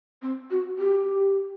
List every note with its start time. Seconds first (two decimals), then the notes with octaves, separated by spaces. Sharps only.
0.22 C4
0.51 F#4
0.78 G4